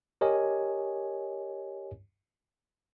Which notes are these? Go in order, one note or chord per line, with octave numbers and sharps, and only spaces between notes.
G4 A#4 C#5 D#5 G#5